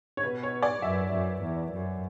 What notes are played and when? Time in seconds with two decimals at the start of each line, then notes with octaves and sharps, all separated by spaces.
0.17 C#5
0.23 B2 B4
0.43 C#5
0.62 D5
0.82 F#2 E5
1.13 F#2
1.42 E2
1.72 F#2